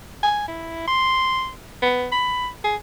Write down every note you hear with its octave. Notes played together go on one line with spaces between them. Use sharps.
G#5
E4
C6
B3
B5
G#4